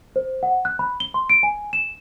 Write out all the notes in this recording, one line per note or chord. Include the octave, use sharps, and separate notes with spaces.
C5
F#5
F#6
B5
G7
C6
D7
G#5
E7